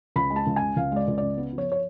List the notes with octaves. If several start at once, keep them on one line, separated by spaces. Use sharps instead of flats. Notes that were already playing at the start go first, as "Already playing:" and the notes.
C#2 B5
G#3
A5
C#2
G#5
C#3
C#2 F5
G#3 D5
C#2
C#3 D5
B3
F3
C#5
C#5